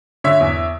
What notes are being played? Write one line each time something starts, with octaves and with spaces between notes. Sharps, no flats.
D3 C#5 E5
E2